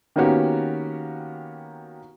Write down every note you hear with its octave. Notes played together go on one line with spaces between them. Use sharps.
D#3 A#3 B3 C#4 F#4 G4